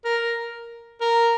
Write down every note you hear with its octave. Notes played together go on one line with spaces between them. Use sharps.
A#4
A#4